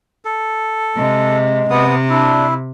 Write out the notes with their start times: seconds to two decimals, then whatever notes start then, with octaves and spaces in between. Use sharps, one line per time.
0.25 A4
0.96 C3 G#3
1.70 C3 B3 D#6
2.09 D4 E4